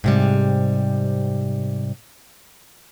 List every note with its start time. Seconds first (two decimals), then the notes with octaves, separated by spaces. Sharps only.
0.04 G#2 C3 G3